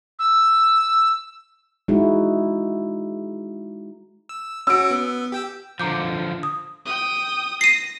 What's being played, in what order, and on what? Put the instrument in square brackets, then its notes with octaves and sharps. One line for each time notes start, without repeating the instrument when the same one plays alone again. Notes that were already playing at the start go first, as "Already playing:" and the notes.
[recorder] E6
[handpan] G#3 D#4 E4 F#4
[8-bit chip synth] E6
[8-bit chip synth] C#4 F#4 [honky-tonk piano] E6 D7
[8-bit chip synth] B3
G4 G5 E6
[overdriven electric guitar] D3 F3 [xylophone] A#5 D6 G6
[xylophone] D#6
[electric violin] G5 D#6
[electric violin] A#6 [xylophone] C7 D#7